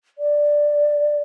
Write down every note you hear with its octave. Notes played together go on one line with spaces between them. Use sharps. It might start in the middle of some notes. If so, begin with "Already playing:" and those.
D5